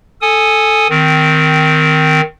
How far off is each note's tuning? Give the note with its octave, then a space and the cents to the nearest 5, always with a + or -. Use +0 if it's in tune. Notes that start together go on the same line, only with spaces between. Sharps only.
A4 +0 G#5 +0 D#6 +0
D#3 +0 C4 -20